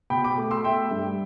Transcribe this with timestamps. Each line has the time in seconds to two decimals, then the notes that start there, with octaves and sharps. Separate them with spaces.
0.10 B2 G5 B5
0.24 B5 D6
0.37 A3
0.51 C6 E6
0.64 A3 E5 G5
0.91 G2